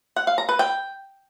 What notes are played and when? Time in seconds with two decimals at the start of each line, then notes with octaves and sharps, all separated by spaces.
0.16 F#5
0.27 F5
0.38 A#5
0.49 B4
0.59 G5